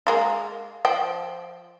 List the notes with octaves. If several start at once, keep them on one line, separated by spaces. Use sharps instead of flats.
G#3 A#3 F4
F3 G5